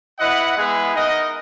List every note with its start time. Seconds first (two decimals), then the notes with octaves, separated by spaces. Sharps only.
0.18 E4 B4 D#5 F#5
0.55 G#3 B3 E4 G#4 B4
0.93 D#4 A#4 D#5 F#5